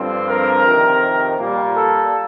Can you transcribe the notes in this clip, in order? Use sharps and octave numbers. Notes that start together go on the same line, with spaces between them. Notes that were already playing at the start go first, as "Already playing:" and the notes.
Already playing: G2 D3 F3 C4
A#4
F2 C3 D#3
A#2 G3 A#3
A4